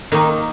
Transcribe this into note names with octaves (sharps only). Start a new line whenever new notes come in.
D#3 A#3 D#4